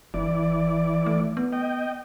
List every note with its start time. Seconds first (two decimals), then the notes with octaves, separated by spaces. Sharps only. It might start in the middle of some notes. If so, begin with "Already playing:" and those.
0.14 F#1 E3 D5
1.06 A3
1.37 B3
1.53 D#5 G5